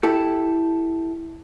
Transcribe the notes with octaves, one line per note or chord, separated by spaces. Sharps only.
E4 G4 A4